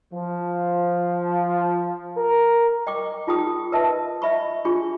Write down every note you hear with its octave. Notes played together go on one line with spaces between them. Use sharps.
F3
A#4
D#5 G5 C#6 D6
D#4 F4 G#4 G5 D#6
A#4 B4 D#5 E5 A5
D#5 E5 B5 C#6
D4 F4 G#4 C#6